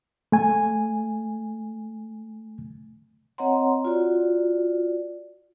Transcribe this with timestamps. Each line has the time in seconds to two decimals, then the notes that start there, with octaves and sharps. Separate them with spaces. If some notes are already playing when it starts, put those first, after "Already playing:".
0.32 A3 G#5
3.38 C4 C#5 D#5 F#5 A#5 C6
3.85 F4 F#4 D5